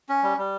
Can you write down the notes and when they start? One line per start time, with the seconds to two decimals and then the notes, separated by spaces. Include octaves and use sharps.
0.09 C#4
0.23 G3
0.38 G3